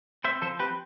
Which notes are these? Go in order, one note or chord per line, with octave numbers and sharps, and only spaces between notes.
C4 C5 E5
F3 A4 C5
C4 G4 B4